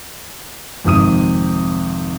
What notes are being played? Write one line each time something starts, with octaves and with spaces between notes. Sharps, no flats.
G#1 F2 C3 D#6 D#7